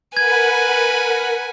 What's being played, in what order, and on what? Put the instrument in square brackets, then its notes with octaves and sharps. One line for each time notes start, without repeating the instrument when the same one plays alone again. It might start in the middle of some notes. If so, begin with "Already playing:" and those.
[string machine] A#4 F#5 B5 [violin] B4 G#5 [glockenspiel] G#6